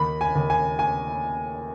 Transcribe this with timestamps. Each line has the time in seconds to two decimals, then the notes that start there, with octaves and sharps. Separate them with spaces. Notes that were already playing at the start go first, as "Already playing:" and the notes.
Already playing: D#2 B5
0.21 G#5
0.35 D#2
0.50 G#5
0.79 G#5